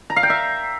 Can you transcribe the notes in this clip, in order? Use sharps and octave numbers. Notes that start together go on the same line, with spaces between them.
A#5
F5
G5
E5